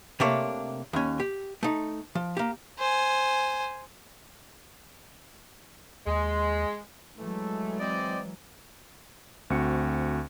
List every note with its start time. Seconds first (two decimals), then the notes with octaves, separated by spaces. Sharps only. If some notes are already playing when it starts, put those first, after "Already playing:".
0.20 C3 A3 A#3 D4 C#5 D5
0.93 D#2 C#4
1.20 G4
1.63 A3 D#4
2.15 F3
2.37 A#3 G4
2.79 C5 G#5
6.07 D#2 G#3
7.18 E3 F#3 G#3 A3
7.79 C4 D5 D#5
9.50 D2 C4 F#4 C#7